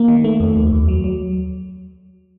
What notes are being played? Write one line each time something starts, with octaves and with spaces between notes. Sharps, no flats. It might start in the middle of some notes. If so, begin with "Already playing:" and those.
Already playing: A#3
D#3
A3
F2
D#2
D#2
F#3
F#3